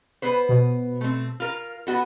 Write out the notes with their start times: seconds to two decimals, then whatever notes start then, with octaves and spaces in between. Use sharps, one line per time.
0.22 B3 B4 C5
0.49 B2
1.01 A3 C4
1.40 F4 A#4 F6
1.87 B3 F#4 A4